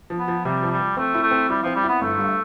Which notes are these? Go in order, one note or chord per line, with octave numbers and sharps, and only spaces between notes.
F3
B3
F3
C3 G3
F3
G3
F3
A3 C4
E4
A3
C4
G3 E4
F3 C4
G3
B3 E4
G1 A3
G2